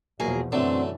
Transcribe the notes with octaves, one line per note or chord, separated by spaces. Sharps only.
E2 B2 F3 F#3 A#3 G#4
F#2 B2 D3 E3 F#3 A3 C4 D4